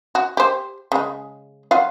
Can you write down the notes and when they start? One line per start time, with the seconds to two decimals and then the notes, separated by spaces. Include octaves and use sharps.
0.15 F#4
0.37 G4 C5
0.92 C#3 G#3
1.71 F#3 F4 F5